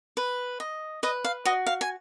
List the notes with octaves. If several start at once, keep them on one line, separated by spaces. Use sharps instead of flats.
B4
D#5
B4 D#5
F5
F#4 D#5
F5
G#5